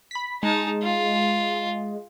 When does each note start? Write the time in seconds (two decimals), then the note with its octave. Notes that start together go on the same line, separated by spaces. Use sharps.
0.11 B5 B6
0.43 G#3 D#4 A5
0.83 F4